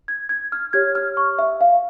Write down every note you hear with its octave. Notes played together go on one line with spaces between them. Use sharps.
G#6
G#6
F6
G4 C#5 G#6
F6
C#6
E5
F5